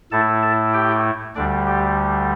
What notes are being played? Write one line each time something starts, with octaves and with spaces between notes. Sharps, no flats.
A2 A3 E4 A4 A5
A4 A5
G4 G5
D2 D3 G3 D4 D5
G4